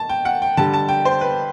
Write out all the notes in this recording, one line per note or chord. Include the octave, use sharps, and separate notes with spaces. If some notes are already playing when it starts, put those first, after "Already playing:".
Already playing: A5
G5
F#5
G5
D3 G3 A5
A5
G5
C5
B4